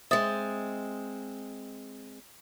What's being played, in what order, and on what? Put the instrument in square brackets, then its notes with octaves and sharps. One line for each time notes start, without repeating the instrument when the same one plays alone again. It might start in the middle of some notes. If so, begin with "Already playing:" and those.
[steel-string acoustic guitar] G#3 C4 [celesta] E5 D#6 A6